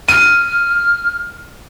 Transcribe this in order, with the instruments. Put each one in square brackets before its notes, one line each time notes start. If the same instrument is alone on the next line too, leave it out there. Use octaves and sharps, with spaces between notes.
[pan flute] F6 [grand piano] D#7